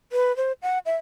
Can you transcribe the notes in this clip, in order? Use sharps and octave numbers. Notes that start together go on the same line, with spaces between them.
B4
C5
F#5
E5